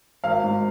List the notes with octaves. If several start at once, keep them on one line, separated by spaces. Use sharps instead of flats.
G#1 F5
G#2